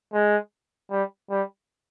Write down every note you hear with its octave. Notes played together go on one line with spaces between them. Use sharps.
G#3
G3
G3